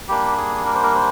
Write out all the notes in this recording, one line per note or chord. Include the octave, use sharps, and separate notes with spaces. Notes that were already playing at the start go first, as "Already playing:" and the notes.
G3 A#3 D4 G4
G#4
A#4
C5
A#4
C5